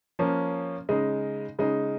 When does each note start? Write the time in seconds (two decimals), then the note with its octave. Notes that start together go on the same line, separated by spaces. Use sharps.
0.19 F3 A#3 C#4
0.89 C#3 G#3 D#4
1.59 C#3 G#3 D#4